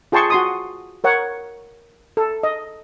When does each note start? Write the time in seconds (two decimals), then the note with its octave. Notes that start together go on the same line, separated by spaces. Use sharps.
0.12 F4 G#4 G5 A5 C6 C#6
0.30 F#4 C6 D#6
1.04 A#4 C#5 F#5
2.17 A4
2.43 D#5